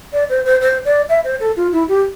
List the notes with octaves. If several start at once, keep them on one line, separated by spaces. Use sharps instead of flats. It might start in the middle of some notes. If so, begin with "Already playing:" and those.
D5
C5
C5
C5
D5
E5
C5
A4
F4
E4
G4